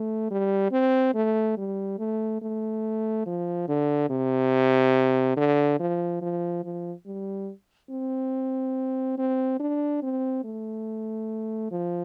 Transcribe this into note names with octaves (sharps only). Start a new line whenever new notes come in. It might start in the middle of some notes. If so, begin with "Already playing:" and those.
Already playing: A3
G3
C4
A3
G3
A3
A3
F3
D3
C3
D3
F3
F3
F3
G3
C4
C4
D4
C4
A3
F3